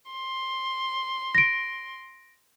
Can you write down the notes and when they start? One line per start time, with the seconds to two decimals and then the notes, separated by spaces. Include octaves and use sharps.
0.11 C6
1.35 A#6 D7